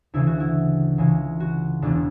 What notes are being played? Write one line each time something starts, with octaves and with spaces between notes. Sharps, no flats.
D2 C#3 E3 E4
F#4
E4
C#2 C#3 E3
F#4
E1 E2 B2 D4